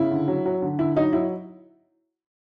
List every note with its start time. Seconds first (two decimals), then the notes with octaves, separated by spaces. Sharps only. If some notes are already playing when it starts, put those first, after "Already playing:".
Already playing: C#3 E4
0.11 D3
0.28 F#3
0.46 F#3
0.62 D3
0.79 D3 E4
0.96 F#3 D#4
1.13 F#3 E4